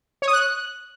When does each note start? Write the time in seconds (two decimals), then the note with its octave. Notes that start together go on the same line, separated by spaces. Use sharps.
0.22 C#5
0.28 D#6
0.33 F#6